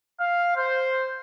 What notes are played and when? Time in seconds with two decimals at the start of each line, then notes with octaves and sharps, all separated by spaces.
0.19 F5
0.55 C5